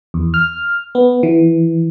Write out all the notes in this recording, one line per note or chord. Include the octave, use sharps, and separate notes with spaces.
E2
F6
B3
E3